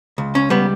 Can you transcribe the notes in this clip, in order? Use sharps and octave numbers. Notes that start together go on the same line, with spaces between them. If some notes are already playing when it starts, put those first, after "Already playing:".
C#2
C#4
G3 B3